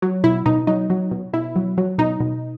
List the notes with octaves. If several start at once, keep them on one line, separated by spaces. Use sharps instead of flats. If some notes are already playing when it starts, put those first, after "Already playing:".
F#3
B2 E4
B2 D#4
F#3 D#4
F#3
B2
B2 E4
F#3
F#3
B2 D#4
B2